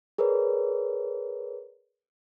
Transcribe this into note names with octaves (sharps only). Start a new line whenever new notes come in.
G#4 A#4 B4 C#5 D5